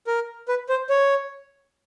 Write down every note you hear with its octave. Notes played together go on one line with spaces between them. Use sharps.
A#4
B4
C5
C#5